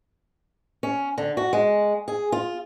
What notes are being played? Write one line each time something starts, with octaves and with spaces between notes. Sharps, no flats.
C#4
D3
F#4
G#3
G#4
F4